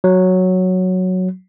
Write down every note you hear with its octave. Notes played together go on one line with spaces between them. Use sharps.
F#3